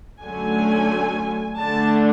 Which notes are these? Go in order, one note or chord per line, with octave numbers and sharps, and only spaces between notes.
D3 F#3 A3 C#4 G#5
D3 A3 D4 A5